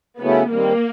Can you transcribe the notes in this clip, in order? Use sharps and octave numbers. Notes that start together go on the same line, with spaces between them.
C#3 F#3 A3 B3 C#4 E4
D#3 G3 A#3 C4